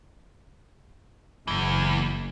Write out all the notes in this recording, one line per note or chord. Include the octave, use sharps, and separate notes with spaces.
F#1 E2 E3